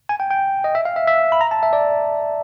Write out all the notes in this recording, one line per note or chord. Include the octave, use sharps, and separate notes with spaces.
G#5
G5
G5
D#5
E5
F5
E5
E5
B5
A#5
A5
E5
D5